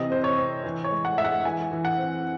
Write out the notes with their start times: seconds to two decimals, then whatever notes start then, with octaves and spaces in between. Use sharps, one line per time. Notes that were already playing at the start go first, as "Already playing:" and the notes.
Already playing: C3 E3 D#5
0.10 C4 C5
0.24 C#5
0.38 C4
0.64 E3
0.84 C#5
0.90 G#3
1.05 F#5
1.18 G#3 E5
1.24 F#5
1.45 E3 G#5
1.72 E3
1.85 F#5
1.98 C4